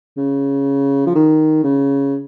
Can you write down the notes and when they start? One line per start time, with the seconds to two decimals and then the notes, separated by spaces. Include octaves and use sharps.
0.17 C#3
1.06 F3
1.15 D#3
1.63 C#3